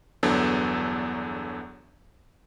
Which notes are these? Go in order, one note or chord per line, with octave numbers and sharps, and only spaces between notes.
G1 E2 F#3 B3 D4 A4